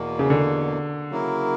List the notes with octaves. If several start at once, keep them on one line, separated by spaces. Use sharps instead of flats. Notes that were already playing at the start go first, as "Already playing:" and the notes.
Already playing: E2 B2 A#3
C#3
D3
C#3 F#3 A#3 E4 A#4